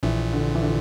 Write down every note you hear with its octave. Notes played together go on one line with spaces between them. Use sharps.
A#1 A#2 E3
D3
E3
D3